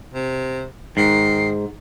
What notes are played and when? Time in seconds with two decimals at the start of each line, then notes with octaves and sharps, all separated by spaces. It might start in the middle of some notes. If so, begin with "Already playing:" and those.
0.14 C3
0.97 G#2 D#3 C7